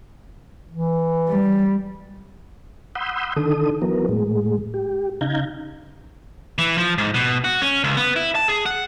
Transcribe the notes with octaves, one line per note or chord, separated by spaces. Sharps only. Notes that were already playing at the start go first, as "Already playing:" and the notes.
E3
G3
F#5 B5 C6 D#6 E6 G6
D3 D#3 A4 D#6
E3 F#3 B3 A#4
A2 G#3
G4
C#3 D#4 F5 A#5 G6 G#6
E3
F3
G#2
B2
F#4
C#4
C#2
B3
E4
A5
G#4
F#5